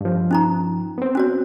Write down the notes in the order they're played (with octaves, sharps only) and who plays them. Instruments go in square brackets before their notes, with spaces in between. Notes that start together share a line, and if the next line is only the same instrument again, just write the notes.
[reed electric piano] G2 F3
[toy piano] C#4 D#4 A#5
[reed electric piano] B3 C4
[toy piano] C#4 F#4 C#5